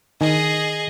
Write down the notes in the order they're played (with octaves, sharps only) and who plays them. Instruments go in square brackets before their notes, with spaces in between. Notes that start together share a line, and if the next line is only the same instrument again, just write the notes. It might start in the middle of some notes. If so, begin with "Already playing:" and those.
[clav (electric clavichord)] D#3 G#5 [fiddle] G#4 D#5